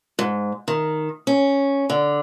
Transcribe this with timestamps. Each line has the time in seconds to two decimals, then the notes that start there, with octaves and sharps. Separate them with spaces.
0.19 G#2
0.68 D#3
1.27 C#4
1.90 D3